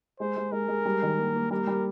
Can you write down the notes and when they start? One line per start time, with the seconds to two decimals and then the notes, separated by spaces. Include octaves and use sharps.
0.20 G#3 C5
0.37 G#3
0.52 G#3 A#4
0.68 G#3
0.85 G3
1.02 D#3
1.18 A#3
1.35 A#3
1.51 G3 A#4
1.67 G3